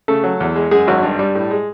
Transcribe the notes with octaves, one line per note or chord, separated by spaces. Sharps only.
C#3 A3 A4
F#3
E2
G#3
F#2 G#3 G#4
G#1 F#3 F#4
G2
G3
A2
G#3